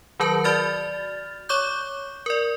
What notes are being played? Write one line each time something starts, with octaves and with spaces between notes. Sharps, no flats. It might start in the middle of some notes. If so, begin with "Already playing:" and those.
D#3 F#3 A#4 A5
F#4 D5 F6 A6
C#5 C#6 D6 G6
A#4 D5